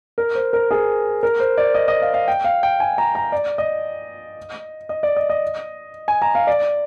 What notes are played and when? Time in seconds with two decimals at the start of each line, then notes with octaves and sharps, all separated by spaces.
0.18 A#4
0.35 C5
0.53 A#4
0.71 G#4
1.23 A#4
1.40 C5
1.58 D5
1.74 D#5
1.88 D#5
2.02 F5
2.14 F5
2.28 G5
2.44 F5
2.63 G5
2.80 G#5
2.98 A#5
3.15 A#5
3.32 D5
3.58 D#5
4.89 D#5
5.03 D5
5.16 D#5
5.30 D#5
6.08 G#5
6.22 A#5
6.35 F5
6.47 D5